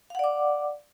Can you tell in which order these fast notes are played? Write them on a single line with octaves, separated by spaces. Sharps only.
F5 F#5 D5 D6